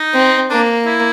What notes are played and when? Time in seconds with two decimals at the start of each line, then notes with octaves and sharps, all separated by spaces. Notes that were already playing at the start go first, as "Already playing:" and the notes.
Already playing: D#4
0.14 C4
0.50 A#3 D4
0.86 E4